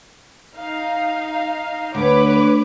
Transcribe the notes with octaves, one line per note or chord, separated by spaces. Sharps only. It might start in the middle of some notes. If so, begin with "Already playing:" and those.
D#4 F5
D2 B4 C#5 D6